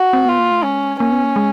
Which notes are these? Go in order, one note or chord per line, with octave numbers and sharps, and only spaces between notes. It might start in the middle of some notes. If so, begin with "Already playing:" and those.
Already playing: F#4
C4
B3 F4
A#3
A3
G#3 C#4
A#3 C#4
B3
A#3
G#3